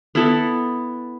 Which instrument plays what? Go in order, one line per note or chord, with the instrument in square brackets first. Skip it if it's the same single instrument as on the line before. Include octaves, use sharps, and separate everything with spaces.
[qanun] B3 E4 A4